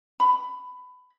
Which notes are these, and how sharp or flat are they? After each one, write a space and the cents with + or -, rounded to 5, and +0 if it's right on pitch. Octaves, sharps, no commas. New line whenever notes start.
B5 +20